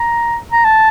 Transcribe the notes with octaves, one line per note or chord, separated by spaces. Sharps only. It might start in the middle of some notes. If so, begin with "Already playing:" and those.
Already playing: A#5
A#5
A5